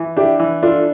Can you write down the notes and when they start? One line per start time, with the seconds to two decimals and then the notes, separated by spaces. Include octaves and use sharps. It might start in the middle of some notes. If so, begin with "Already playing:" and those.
Already playing: E3
0.17 D4 E4 G4
0.40 E3
0.63 D4 F4 A4